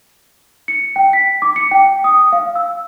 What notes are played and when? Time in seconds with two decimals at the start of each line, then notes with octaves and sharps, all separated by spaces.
0.68 C#7
0.96 G5
1.13 B6
1.42 D6
1.56 C#7
1.71 G5
2.04 D#6
2.33 F5
2.55 E6